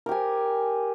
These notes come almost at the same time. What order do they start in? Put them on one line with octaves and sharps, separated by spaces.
A#4 G4 G#5